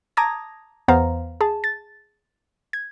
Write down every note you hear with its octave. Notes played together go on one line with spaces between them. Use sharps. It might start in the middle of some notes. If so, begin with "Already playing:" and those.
A5 A#5 D6 D#6 G#6 A#6
E2 B3 C5 F5 A#5
G#4 A5
A6
G#6